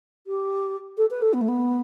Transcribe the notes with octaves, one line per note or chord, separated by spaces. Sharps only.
G4
A4
B4
A4
B3
A3
B3